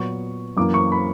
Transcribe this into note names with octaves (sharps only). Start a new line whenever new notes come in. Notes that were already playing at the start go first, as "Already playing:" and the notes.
Already playing: A#2 F#3 B3 C#6
F#2 E3 A#3 D6
C#6
B5